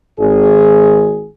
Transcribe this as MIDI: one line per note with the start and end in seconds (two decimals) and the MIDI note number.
0.19 1.28 32
0.19 1.28 68